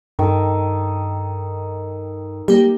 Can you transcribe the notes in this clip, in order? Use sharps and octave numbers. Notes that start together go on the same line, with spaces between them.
G2 D#3 A4
G3 A#3 G4